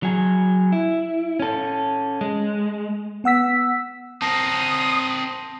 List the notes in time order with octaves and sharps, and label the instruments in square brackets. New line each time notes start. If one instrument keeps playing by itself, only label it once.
[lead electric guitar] F#3 G#4
E4
C#4 A4
G#3
[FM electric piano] B3 F#5 E6 B6
[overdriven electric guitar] C4 A#4 [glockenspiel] A5 A#6 C7 [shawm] D#6